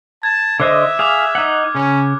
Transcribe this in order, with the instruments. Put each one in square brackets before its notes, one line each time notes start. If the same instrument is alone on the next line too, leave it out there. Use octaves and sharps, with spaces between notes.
[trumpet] A5 [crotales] G#6
[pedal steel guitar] D3 C5 D#5 [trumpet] E5 [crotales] D6 F#6
[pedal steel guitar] G#4 F5 [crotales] D6 F6
[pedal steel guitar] D#4 F#5
[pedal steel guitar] C#3 [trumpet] C#4